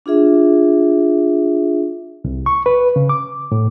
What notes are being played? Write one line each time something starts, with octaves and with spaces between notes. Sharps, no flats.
D4 F4 G#4 E5
C2
C#6
B4
C#3
D6
A2